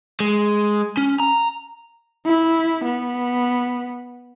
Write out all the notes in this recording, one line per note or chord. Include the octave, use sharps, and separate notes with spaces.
G#3
C#4
A#5
E4
B3